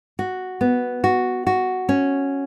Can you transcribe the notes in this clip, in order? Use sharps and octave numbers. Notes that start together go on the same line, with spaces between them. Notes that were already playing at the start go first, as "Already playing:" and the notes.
F#4
B3
F#4
F#4
C#4